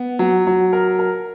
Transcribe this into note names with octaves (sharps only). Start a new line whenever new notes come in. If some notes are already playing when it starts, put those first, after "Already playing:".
Already playing: B3
F#3
F#3
A#4
A#4